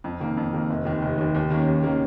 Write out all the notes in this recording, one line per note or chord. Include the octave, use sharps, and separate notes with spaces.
F2
D#3 A#3
F2
D#3 A#3
F1
D#2 D#3
F1
D#2 D#3
D#2
D#3 A#3 C#4
D#2
D#3 A#3 C#4